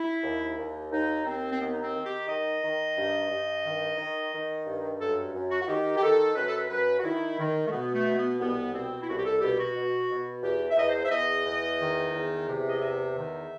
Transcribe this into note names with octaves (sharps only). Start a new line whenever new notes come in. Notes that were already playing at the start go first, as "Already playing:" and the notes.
Already playing: E4
D#2
D#2
D#2 D#4
D#2 C4
C4
D#3 B3
D#4
C4
D#3
G4
D#3 D#5
D#3
G2
G2
D#3
D#3
D#3
G2
F#2 A4
F#2
F#4
F#4
D#3 G4
G4
D#3 A4
F#2 B4
A4
B4
F#2 B4
F#4
D#3 E4
D#3
A3
B2 B3
A3
B2
B3
C2 B3
B2 C4
E4
C2 F#4
G4
A4
B2 G4
F#4
B2
B2
E2 G4
E5
E2 D#5
C5
E5
E2 D#5
E2
D#3
E2
C3
D#5
E2 E5
D#3